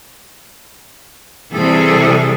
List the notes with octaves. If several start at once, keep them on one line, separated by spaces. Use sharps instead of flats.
C3 E3 G3 G#4 A4